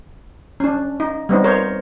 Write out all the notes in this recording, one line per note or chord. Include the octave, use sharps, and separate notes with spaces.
C#4 D4
D#4
G3 B3 C4 D#4
A#4 C5 C#5